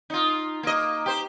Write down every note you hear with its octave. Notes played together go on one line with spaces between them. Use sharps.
D#4 F4
A#3 D#5
G4 C5